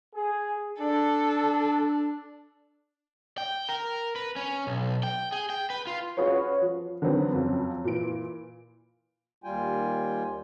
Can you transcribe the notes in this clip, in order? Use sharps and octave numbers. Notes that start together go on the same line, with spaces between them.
G#4
D4 A4
G5
A#4
B4
C#4
B1
G5
G#4
G5
B4
F4
C#4 F4 F#4 G#4 B4 C#5
F3
D3 D#3 F#3 B3 C4
F2 C#3 F#3
A#2 E3 D7
D#2 G3 F4 G5 G#5